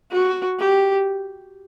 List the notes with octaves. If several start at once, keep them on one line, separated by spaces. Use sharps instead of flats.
F#4
G4